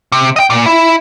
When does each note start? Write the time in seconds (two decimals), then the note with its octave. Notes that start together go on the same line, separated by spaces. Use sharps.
0.12 C3
0.36 D#5 G5
0.50 A#2
0.66 E4